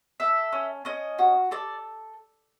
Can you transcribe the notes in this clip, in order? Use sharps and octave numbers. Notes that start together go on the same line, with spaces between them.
A4 E5
C#4
C#4 D#5
F#4
A4 D5